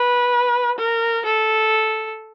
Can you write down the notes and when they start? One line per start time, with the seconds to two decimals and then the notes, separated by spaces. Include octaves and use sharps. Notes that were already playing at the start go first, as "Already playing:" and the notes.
Already playing: B4
0.79 A#4
1.25 A4